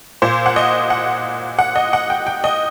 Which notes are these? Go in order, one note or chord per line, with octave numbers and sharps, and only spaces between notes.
A#2 C5
F#5
D#5
F#5
F#5
D#5
F#5
G5
G5
D#5